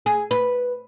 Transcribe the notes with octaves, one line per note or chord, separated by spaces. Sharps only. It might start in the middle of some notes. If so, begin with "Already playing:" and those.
G#4
B4